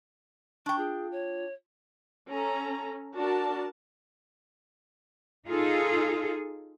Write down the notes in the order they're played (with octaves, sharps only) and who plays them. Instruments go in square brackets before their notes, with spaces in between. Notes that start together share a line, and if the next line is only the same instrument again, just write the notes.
[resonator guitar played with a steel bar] D4 G5 [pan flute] C#6
[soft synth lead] F4 [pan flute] G#4
[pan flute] C#5
[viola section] C#4 A4 A#5
D4 F#4 A#4 D5 A5
[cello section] D#4 F4 G#4 A4